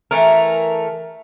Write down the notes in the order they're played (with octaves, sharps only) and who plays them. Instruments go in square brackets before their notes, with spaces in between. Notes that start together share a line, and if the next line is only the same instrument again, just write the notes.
[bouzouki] E3 A3 A#4